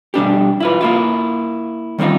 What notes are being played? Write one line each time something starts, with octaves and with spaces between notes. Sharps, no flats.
B2 G3 D4 G4
E4 F4 B4
A#3 E4 F4
D#3 G3 C4 D#4 F4